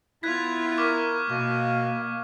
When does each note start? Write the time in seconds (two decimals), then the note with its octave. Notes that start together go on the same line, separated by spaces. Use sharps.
0.23 B3 E4 F4 F#6 G#6 B6
0.77 A#4 C#6 D6 F6
1.30 B2 A#3 F5 C#6